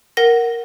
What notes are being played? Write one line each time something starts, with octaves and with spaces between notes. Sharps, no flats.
A#4 F#5 A#6